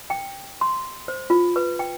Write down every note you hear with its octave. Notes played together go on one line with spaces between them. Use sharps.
G5
C6
C5
F4
B4
G5